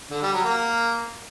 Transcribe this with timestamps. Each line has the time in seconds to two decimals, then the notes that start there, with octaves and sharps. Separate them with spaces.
0.11 D3
0.22 G3
0.33 F#3
0.44 A#3